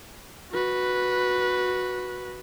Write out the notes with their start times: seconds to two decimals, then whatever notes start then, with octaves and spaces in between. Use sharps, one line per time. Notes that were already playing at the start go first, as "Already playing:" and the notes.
0.52 F#4 B4